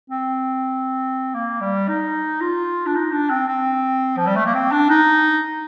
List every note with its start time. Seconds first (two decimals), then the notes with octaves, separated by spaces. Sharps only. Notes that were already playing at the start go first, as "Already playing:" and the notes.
0.10 C4
1.35 A#3
1.61 G3
1.88 D#4
2.41 F4
2.86 D4
2.95 D#4
3.12 D4
3.30 C4
3.48 C4
4.17 F3
4.27 G3
4.36 A3
4.46 A#3
4.54 C4
4.72 D4
4.90 D#4